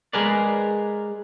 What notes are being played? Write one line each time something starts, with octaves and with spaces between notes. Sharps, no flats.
G#3 G#4 A#4 B4 D5